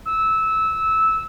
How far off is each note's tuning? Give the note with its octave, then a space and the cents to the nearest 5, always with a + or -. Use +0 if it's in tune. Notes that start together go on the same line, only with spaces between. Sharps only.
E6 -15